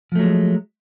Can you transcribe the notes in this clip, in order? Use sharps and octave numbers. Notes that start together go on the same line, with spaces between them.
F3 F#3 G#3 A3